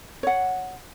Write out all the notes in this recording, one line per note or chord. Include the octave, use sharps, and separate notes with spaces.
C#5 F#5